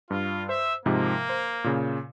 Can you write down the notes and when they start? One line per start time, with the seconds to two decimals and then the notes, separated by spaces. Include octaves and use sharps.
0.10 G2 F4
0.49 C5 E5
0.86 G#2 C3 F3 A#3
1.29 C5
1.64 A#2 C#3